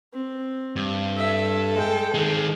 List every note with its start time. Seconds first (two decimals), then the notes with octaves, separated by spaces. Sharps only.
0.14 C4
0.76 G2
1.17 A4 E5
1.75 G#3 G5
2.14 D#3 G#3 G#4